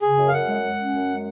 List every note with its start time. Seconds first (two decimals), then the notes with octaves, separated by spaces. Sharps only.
0.02 C#3 G#4
0.17 F#2
0.28 F5
0.33 F#2 F#5
0.48 G#3
0.63 G#3
0.78 C#4
0.94 F#2
1.09 G#3